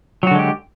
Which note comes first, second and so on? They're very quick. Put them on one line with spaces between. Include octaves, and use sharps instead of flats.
F#3 F#4 D3 G#3 G4